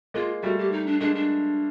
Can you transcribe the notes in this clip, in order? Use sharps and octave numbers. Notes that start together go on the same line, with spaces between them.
G#3 A#3 F4
G3 A3 F#4
G4
D#4
D4
G#3 A#3 D4
D4